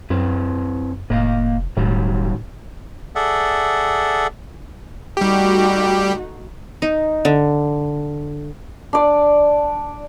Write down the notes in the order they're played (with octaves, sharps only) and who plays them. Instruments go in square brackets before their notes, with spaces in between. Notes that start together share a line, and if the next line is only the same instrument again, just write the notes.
[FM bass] F#2 [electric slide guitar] C4 E4 B4
[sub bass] F1 [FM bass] A2 [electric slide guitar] A#3 D#5 F5
[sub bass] E1 [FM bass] A2 [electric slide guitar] D#3 F#3 G3
[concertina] G#4 A4 D5 E5 F#5
[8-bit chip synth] G3 G4 [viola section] A3 D#4 F#4
[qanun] D#4
D3
[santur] D4 D5